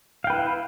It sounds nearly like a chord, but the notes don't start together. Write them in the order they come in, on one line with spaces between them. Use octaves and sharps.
F5 G5 B4 E4